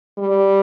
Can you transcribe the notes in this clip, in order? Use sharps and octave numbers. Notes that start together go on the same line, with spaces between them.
G3